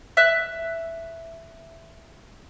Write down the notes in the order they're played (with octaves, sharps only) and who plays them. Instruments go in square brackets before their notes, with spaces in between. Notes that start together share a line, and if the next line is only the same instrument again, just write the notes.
[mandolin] E5 F#6